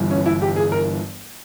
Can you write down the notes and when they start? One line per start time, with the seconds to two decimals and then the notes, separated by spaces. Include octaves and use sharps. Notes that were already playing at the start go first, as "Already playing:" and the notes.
Already playing: G1 G2 E3
0.11 C#4
0.26 E4
0.42 G4
0.56 G#4
0.72 A#4